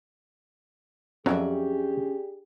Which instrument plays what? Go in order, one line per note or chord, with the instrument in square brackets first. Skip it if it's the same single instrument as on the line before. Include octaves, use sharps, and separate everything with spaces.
[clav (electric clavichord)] F2 F#3 [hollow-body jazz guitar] C#4 D5 E5 [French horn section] D4 G4 G#4